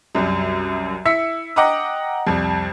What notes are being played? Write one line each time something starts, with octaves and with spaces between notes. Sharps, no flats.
C2 F#2
E4 E6 B6 C#7
D#5 F#5 G5 A#5 D6 D#6
C2 F2